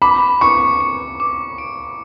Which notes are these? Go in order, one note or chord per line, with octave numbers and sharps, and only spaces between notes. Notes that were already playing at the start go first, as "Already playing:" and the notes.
B5 D6
C#6 C#7
C#7
D6
D7